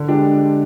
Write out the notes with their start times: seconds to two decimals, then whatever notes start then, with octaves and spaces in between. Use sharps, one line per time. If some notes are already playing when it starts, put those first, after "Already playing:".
Already playing: D3
0.08 G#3 D4 G4